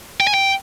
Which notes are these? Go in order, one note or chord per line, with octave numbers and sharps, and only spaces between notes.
G5
G#5
G5